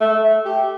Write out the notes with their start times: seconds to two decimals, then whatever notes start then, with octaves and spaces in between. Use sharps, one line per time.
0.01 A3
0.46 G4